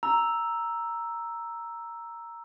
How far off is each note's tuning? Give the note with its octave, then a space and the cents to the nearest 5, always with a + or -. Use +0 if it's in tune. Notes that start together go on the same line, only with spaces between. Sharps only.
A#5 +0 E6 +0